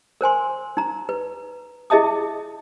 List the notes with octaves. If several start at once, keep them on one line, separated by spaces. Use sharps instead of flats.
A#4 C5 G#5 C6
D#4 A#5
B4
E4 G#4 D#5 E5 A5 D#6